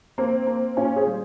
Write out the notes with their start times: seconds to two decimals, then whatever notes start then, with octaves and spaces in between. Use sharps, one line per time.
0.18 A#3 C4
0.47 A#3
0.77 A#2 C#4
0.96 G#4 C5
1.07 G3